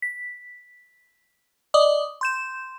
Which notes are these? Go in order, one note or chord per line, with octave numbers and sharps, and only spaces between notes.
B6
D5 D#5 D6 D#6
C6 G6 E7